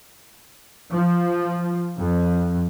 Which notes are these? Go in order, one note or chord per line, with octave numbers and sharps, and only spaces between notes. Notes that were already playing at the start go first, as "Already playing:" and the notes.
F3
F2